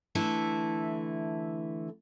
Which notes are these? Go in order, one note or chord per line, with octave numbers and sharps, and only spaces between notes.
D3 E3 A3 E4 A4